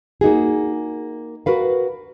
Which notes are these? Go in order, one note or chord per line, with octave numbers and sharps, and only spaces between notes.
A#3 D#4 F#4 G#4
F#4 A#4 B4 F5